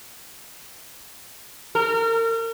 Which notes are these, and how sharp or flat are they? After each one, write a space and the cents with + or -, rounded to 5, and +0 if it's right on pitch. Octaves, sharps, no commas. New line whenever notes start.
A#4 -35